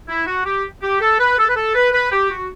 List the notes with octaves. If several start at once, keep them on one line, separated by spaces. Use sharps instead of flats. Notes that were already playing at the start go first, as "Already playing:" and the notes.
E4
F#4
G4
G4
A4
B4
A4
B4
A4
B4
B4
G4
F#4